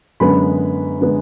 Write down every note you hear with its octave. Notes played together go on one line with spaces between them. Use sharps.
F#2 D3 G#3 B3 B5
D3 G#3 B3